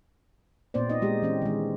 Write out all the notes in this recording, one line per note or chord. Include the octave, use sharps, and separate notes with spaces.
A#2 B3 C4 C5 D5
D#4 D#5
G#3 G4
E3 C4 C#4
D#3 G#3